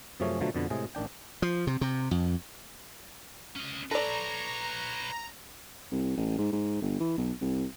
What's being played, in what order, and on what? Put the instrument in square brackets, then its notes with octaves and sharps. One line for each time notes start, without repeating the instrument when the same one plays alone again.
[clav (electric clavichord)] F#2 C3 F3 A3 C#4 G#4
B2 D3 F3 F#3 A3
F2 B2 D3 B3
A2 C3 G#3 G#4
A1 D#3 D4 G5
[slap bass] F3
C3
C3
F2
[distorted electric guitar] C#4 D#5
[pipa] A4 D5 [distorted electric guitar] B4 C#5 [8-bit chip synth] A#5
[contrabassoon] C2
A1
G#2
G#2
G1
E3
B1
C2